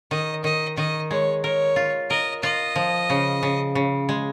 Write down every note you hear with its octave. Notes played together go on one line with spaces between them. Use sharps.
D#3 D#5
D#3 D#5
D#3 D#5
G#3 C#5
A#4 C#5
F4
A#4 D#5
F4 D#5
F3
C#3
C#3
C#3
G#3